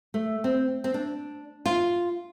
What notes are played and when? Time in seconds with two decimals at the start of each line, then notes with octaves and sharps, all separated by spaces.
0.14 A3
0.44 C4
0.84 C4
0.94 D4
1.66 F4